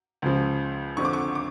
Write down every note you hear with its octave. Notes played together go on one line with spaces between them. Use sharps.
C#2 C#3 F3
F2 D3 F3 C#6
D6
C#6
D6